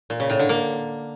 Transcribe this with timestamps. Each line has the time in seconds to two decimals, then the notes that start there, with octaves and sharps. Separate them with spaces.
0.10 A#2
0.20 C#3
0.30 A2
0.39 D3
0.49 A#3